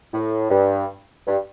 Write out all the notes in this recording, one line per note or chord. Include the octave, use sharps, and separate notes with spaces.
A2
G2
G2